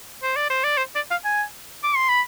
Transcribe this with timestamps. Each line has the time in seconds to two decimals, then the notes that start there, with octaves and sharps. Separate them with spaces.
0.23 C5
0.36 D5
0.50 C5
0.64 D5
0.77 C5
0.96 D5
1.11 F5
1.25 G#5
1.84 D6
1.96 C6
2.09 B5